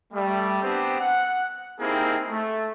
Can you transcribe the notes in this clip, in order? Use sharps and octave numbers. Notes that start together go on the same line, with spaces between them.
G3 A3
B3 C4 D4 G4
F#5
A#3 C4 D#4 E4 G4 G#4
A3